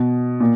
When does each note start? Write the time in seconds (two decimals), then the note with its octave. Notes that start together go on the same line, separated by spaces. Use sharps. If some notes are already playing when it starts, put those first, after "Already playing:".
Already playing: B2
0.40 A#2